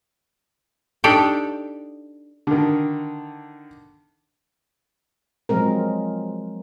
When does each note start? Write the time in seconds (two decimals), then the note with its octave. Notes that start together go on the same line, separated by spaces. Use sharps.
1.04 D4 D#4 G4 A4 D5 G5
2.47 D3 D#3
5.49 F3 F#3 G#3 C4 A#4